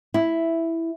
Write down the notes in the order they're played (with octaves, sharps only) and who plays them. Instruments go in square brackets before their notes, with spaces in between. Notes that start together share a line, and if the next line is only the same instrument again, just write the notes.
[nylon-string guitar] E4